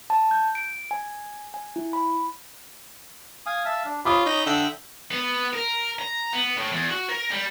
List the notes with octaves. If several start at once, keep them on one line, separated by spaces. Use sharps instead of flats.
A5
G6
D7
G#5
G#5
E4
B5
F5 G#5 D#6
E5 F5 A5
D4
C#4 F4 B5 D6 D#6
D#4
D3 E5 G5
B3
A#4
A#5
B3
A2
E2
F#4
A#4
G3